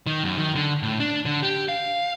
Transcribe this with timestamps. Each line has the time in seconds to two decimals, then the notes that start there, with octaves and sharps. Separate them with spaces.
0.07 D#3
0.24 F#2
0.37 D#3
0.55 D3
0.82 A2
1.00 D4
1.25 D3
1.43 G4
1.69 F5